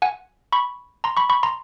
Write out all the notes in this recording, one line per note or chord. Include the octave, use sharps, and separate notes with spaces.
F#5 G#5
B5 C#6
A#5 C6
B5 C#6
B5 C#6
A#5 C6